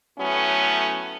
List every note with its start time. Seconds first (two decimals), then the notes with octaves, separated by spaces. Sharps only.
0.18 A2 F#3 A3 B3 C#4